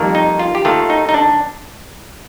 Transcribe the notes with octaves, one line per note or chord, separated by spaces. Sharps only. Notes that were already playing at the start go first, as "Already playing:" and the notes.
Already playing: F2 D#3 G3 A#3
D#4
F4
G4
D#2 D#3 A3 F4
D#4
D#4
D4